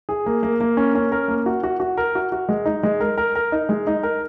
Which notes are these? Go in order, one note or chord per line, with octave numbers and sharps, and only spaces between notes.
G#4
A#3
A#3
A#3
C#4
C#4
A#4
A#3
F#4
F#4
F#4
A#4
F#4
F#4
G#3
D#4
G#3
A#4
A#4
A#4
D#4
G#3
D#4
A#4